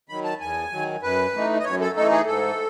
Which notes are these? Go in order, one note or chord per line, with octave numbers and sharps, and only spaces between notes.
D#3 F#3 B5
A5
E2 G#5
D#3 F#3
F#2 B4
E3 A3 D#4
D#5
F#2 C#5
A4
E3 A3 D#4 A4
G#4
G#2 A4